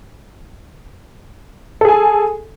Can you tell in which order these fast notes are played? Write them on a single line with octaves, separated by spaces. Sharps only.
A4 G#4 G#5